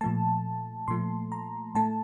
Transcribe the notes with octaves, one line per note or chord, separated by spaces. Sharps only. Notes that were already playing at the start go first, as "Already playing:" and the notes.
A#2 F3 A3 A5
A#2 F3 A3 C6
A#5
A2 A3 A5